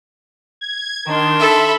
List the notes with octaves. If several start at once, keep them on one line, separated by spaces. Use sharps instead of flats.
G#6
D#3 D4 C6
A4 E5 B5